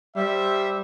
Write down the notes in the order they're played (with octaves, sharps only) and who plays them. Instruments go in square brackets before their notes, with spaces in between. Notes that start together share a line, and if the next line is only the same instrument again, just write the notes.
[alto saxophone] G3 [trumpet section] C5 E5